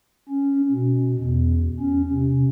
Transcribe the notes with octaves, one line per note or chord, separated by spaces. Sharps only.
C#4
B2
E2
C#4
C3